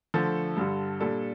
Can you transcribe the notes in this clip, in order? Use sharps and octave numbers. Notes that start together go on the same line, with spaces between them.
D3 F3 A3 A4
G2 D3 G3
A#2 G3 D4 A4